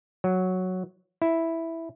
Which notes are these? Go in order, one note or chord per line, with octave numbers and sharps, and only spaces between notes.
F#3
E4